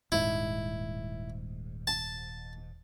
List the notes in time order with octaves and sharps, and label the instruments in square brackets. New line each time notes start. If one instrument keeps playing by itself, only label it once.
[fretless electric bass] D#1 G#2 [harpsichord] E4
[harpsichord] A5